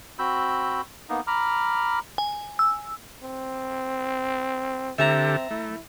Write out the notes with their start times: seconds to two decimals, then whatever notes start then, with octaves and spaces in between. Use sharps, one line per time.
0.19 C4 F#4 B5 E6 G6
1.09 A#3 B3 D#4
1.27 A#5 B5 D6 F6
2.18 G#5
2.59 E6
3.23 C4
4.98 D3 C4 G4 A4 E5 A5 A#5
5.51 A3 E4